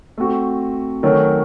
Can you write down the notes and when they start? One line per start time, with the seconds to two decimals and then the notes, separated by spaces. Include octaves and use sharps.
0.18 A3 C4 F#4
1.03 D#3 F#3 A3 C#4